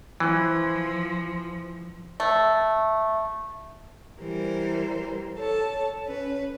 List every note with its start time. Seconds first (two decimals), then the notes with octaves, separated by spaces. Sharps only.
0.20 E3 F3
2.20 A3
4.19 E3 G3 A#4 C5
5.38 A4 C#5 A5
6.05 C#4 B4